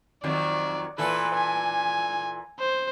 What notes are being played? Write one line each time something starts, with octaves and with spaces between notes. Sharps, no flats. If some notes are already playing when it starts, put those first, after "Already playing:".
F2 D#3 F#3 D5
A#2 E3 A4 B4
G#5
C5